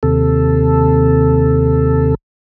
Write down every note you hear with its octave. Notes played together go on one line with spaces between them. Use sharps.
D#2 C3 A4